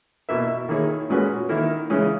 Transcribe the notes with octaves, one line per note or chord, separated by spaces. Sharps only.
B2 A#3 E4 B4 E5
D#3 A#3 E4 G#4 C#5
A#2 G#3 C#4 F#4 B4
D#3 A#3 E4 A#4
C#3 E3 G#3 C#4